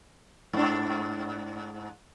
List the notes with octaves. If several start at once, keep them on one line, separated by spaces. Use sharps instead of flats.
G#2 D4